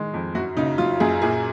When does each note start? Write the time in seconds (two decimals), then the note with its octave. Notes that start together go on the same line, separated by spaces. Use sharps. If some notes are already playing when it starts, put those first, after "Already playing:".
Already playing: D#3 G#3
0.14 F2
0.35 F#2 F#4
0.57 C#3 D#4
0.78 F#3 F4
1.00 F#2 G#4
1.22 A#2 G#4